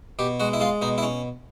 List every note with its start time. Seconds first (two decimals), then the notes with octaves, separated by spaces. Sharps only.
0.19 B2 G4
0.40 G#3 F#4
0.53 E4
0.60 G#3 F4
0.82 B2 D#4
0.98 E4
1.03 C#4